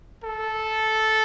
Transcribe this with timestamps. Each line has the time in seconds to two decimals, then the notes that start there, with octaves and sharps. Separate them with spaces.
0.24 A4